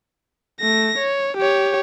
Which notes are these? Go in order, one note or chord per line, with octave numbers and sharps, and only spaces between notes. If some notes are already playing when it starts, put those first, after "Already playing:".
A3 A#6
C#5
G4 C#5